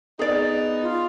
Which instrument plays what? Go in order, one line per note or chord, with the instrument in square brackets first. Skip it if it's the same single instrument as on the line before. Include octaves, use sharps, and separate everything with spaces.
[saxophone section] B3 D#4 [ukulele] G#4 D5
[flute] F4